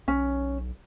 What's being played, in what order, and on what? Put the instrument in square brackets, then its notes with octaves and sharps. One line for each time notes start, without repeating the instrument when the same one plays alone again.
[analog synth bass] B1 [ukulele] C#4